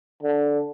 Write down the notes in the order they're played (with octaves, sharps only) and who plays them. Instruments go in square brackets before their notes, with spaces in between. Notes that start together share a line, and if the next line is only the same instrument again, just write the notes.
[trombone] D3